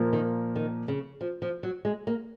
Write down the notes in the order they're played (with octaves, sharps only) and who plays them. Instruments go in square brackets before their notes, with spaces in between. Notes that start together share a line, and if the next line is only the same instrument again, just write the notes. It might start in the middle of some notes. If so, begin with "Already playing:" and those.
Already playing: [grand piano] A#2 F3 A#3
[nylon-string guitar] D#3
D#3
C#3
F3
F3
F#3
G#3
A#3